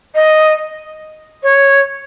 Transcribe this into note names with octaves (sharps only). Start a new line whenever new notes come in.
D#5
C#5